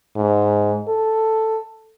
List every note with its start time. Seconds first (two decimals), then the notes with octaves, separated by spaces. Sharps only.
0.16 G#2
0.88 A4